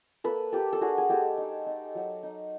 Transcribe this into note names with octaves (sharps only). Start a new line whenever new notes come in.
A#3 A4 B4
A#3 G4 A4
A4
D4 F#4 G#4
G#4
G#3 G4 A4
D#4
D#4
F#3
D#4